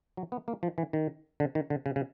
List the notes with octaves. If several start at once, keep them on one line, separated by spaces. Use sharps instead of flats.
F#3
B3
A#3
F3
E3
D#3
D3
D#3
D3
C#3
C#3